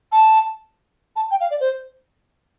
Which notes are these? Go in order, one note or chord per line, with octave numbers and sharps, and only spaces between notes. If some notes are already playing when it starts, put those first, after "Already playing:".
A5
A5
G5
F5
D5
C5